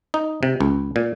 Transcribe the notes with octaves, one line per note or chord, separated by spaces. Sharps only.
D#4
C3
C#2
A#2